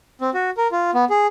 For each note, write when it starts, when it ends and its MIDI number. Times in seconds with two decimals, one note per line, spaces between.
0.21 0.30 60
0.34 0.50 66
0.57 0.68 70
0.72 0.91 65
0.94 1.05 59
1.10 1.27 68